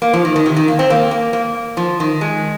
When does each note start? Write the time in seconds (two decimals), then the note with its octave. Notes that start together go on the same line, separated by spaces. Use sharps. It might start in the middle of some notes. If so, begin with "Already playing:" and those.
0.02 A#3
0.13 F3
0.25 D#3
0.36 D#3
0.46 C3
0.56 D#3
0.68 A#3
0.79 C4
0.90 A#3
1.11 A#3
1.33 A#3
1.77 F3
2.00 D#3
2.21 G#3